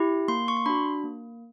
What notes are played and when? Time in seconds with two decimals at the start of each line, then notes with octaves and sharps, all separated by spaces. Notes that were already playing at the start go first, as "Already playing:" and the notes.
Already playing: E4 G4
0.28 A#3 C6
0.48 C#6
0.57 C6
0.66 D4 F#4 B5
1.04 A#3